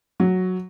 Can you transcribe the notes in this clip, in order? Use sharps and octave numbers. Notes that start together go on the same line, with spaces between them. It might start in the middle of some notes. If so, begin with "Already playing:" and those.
F#3